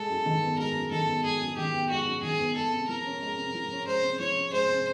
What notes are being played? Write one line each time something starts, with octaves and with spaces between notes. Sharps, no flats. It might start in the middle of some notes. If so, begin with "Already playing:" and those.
Already playing: G#3 A4
F#2
D#3
B3
G#3 A#4
F#2
D#3 A4
B3
G#3 G#4
F#2
D#3 G4
B3
G#3 F#4
F#2
D#3 G#4
B3
G#3 A4
C3
F3 A#4
C#4
G#3
C3
F3
C#4
G#3 C5
C3
F3 C#5
C#4
G#3 C5
C3